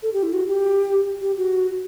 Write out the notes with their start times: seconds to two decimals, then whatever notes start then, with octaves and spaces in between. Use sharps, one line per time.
0.03 A4
0.13 G4
0.23 E4
0.33 F#4
0.47 G4
1.22 G4
1.37 F#4